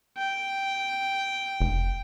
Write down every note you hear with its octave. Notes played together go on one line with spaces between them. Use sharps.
G5
F1